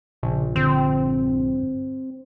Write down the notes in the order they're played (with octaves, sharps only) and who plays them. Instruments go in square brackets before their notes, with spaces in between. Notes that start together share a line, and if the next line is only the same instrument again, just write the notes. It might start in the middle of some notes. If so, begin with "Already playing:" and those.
[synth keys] A#1 [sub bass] C#3
[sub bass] G2 [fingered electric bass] D3 [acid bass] C4